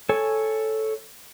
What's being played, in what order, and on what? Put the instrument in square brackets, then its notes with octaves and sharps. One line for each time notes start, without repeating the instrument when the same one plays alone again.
[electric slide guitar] A4 C#5 G#5